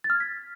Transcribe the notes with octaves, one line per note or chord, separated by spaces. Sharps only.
A6
F6
G#6
B6